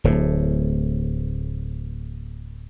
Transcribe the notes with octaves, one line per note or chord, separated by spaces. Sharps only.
D1 A2